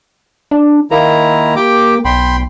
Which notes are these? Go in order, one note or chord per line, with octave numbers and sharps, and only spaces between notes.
D4
D#3 A#3 E4 A#5
G4 G5 D6
B1 G5 B5 C6